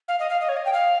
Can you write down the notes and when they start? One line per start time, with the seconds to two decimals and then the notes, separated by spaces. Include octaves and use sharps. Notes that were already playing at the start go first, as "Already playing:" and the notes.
0.08 F5
0.19 D#5
0.29 F5
0.41 D#5
0.49 C#5
0.57 D#5
0.65 G5
0.73 F5